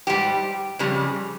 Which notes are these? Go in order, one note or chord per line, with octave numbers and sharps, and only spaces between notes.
G#2 G3 G4
F2 C#3 G3